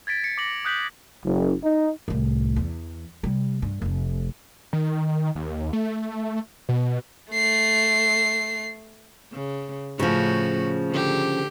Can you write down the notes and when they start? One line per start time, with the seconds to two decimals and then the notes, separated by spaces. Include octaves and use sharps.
0.07 G#6 A6 B6 D7
0.24 C#7
0.38 D6 A#6 F#7
0.65 D#6 F#6 G6 B6 C#7 F#7
1.25 F#1
1.63 D#4
2.08 C2 A2
2.56 E2
3.23 C3 G3
3.62 G2
3.82 F1 C4
4.73 D#3
5.35 D#2
5.73 A3
6.69 B2
7.32 A3 C7
9.33 C#3
9.99 A2 C#3 F3 F#4
10.91 D3 G4